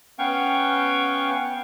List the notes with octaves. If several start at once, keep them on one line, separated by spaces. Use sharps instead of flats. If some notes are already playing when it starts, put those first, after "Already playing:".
B3 C#4 F5 G5 C#6